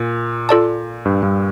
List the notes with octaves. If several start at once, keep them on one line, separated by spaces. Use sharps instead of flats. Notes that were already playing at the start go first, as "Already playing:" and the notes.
Already playing: A#2
F4 A4 D5 A5
G2
G2